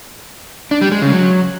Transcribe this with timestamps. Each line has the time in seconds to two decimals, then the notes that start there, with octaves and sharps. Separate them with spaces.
0.71 D4
0.81 G3
0.92 G#3
1.02 C#3
1.12 F#3